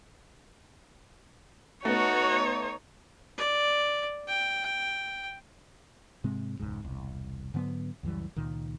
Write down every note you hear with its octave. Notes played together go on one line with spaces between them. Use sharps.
A3 B3 D#4 F#4 C#5
D5
G5
G#2 C3 G#3 C4
E1 C#2 G#2
E1 C2
G#2 D3 F#3 B3
C#2 F#2 E3 G3
C#2 A#2 D#3